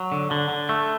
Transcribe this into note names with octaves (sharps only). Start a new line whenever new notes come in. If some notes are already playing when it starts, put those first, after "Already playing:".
Already playing: F#3
D3
D3
D3
A3